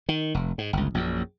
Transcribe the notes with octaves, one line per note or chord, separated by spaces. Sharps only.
D#3
F1
G#2
G1 C#2
A#1 F#2